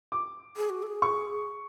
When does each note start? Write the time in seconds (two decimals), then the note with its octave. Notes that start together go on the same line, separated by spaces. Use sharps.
0.12 D6
0.57 G#4
0.70 F#4
0.83 A4
0.87 G#4
1.02 C#6